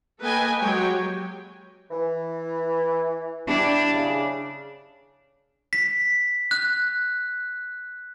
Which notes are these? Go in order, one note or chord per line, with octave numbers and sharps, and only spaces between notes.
A#3 A4 B4 D#5 G5 G#5
F#3 G#3 G4 C#5 G5
E3
D4 E4 G4
C#3
B6
F#6